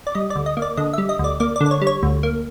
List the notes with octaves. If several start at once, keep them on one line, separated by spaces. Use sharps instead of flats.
D5
G3 D#5
D5
D2
D#5
A#3
D5
D3 D#5
G3 E5
D#5
D2 D5
A#3 D5
D5
D3
D5
C#5
G3
C#5
D2
A#3